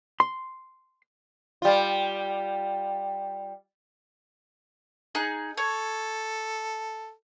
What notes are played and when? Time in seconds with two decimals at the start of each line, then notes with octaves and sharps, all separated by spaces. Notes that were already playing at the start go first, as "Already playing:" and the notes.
0.20 C6
1.62 G3 F4
5.15 D#4 G#4 F#6
5.57 A4 C#5